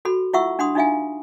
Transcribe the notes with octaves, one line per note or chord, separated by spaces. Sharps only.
F#4 A4 B5
E4 F4 E5 F#5 C#6 E6
D4 F#5 B5 C6 D#6
D4 D#4 F4 E5 F5 G#5